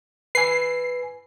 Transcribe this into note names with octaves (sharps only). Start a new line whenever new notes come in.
B4 G#5 C7